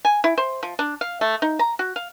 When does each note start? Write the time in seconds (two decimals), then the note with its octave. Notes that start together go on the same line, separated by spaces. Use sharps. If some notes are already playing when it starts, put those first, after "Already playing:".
0.05 G#5
0.24 E4
0.38 C5
0.63 F3
0.79 D4
1.01 F5
1.21 A3
1.42 D#4
1.59 A#5
1.79 F#4
1.96 F5